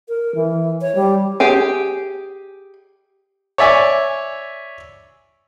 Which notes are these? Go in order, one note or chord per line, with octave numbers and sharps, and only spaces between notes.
A#4
E3
C#5
G3
G4 G#4 G#5
C#5 D5 E5 G#5